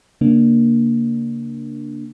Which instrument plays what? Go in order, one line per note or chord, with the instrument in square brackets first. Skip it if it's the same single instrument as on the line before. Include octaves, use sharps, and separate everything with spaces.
[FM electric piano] C#3 A#3 D4